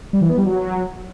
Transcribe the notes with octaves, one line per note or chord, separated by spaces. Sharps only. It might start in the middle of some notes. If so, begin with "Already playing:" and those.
G3
E3
B3
G3
F#3